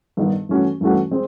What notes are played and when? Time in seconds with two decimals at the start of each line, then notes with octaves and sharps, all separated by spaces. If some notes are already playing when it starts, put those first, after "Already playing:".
0.17 G2 D#3 G3 B3 D#4
0.49 G2 E3 A3 C#4 F#4
0.81 G2 E3 A3 C#4 F#4
1.11 G#3 C4